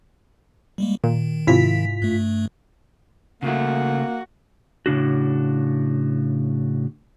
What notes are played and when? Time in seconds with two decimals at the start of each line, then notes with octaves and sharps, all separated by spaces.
0.78 G3 G#3 A#3
1.04 A#2 D#3
1.47 G#2 C3 E4 F4 B6
2.02 G2 A3
3.43 C#3 A3 A#3 F#4
4.86 A2 C#3 D4 F#4